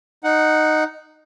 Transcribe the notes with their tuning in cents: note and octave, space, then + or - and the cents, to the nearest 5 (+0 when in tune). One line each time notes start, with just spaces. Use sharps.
D#4 -5 F#5 +0